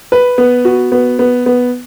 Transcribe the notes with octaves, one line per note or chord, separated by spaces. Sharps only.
B4
B3
F#4
B3
B3
B3